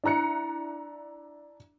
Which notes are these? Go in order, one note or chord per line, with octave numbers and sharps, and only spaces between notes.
D4 E4 A#5 F#6 C#7